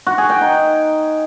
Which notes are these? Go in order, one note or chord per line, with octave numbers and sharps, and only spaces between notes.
F#4
G#4
G5
D#4